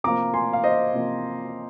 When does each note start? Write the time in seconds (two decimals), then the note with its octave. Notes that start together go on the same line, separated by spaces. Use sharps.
0.04 C3 F3 A#3 A#5 D6
0.34 G#5 C6
0.53 F5
0.64 C5 D#5
0.93 C3 F3 A#3